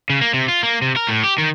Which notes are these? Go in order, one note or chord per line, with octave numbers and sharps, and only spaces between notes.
C#3
A#3
C3
F4
A#3
C3
A#4
A2
G4
D#3